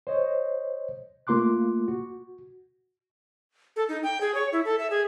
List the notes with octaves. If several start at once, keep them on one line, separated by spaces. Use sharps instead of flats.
C5 C#5 D#5
A3 A#3 F4 C6 D6 F#6
F#4
A4
D#4
G5
G#4
C#5
E4
A4
E5
G#4